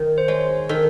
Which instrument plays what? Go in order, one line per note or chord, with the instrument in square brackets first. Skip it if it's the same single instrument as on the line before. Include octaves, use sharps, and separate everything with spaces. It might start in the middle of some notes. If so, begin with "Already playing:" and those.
Already playing: [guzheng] D#3
[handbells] C5
[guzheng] G#3 [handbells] C#5
[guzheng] D#3 [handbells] A4